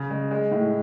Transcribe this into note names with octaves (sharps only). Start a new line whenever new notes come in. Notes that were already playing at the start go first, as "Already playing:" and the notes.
Already playing: C#3
G#3
G#3
A2